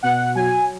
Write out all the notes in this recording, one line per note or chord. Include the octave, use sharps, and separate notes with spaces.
B2 F#5
F#3 G#5